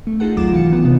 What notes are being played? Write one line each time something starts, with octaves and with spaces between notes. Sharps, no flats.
A3
D#4 F4 G#4 A4 F#5
G#1 D#2 F#3 F4 D6 E7
C2 E3 F5 C#7
D#3 E3 B3
C3 B3 F4